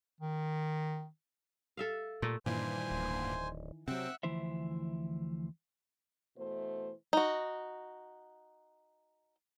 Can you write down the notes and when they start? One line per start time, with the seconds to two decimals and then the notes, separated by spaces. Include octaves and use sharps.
0.21 D#3
1.77 A4 E5 F5
2.22 A#2 A3
2.46 G2 A#2 D#3 E3 C5 G#5 C6
2.91 D1
3.88 C3 F#3 C4 E5 F#5
4.23 D2 E3 F3 E4 C5 E5
6.37 B2 E3 A3 C5
7.13 D#4 F#4